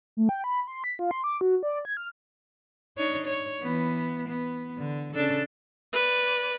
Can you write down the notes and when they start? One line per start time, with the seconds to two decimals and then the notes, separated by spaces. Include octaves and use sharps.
0.17 A3
0.29 G5
0.44 B5
0.68 C6
0.84 B6
0.99 F4
1.11 C6
1.24 D6
1.41 F#4
1.63 D5
1.85 G#6
1.97 F6
2.97 D4 D#4 C#5
3.27 C#5
3.61 E3 B3
4.28 B3
4.78 D3
5.14 C#3 D4 A4
5.93 B4 D5